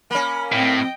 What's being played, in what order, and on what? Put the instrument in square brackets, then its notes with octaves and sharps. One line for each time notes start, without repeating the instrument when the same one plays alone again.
[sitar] A#3 C#4 [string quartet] B5
[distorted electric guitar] A2 [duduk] C4 [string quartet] D#5 G5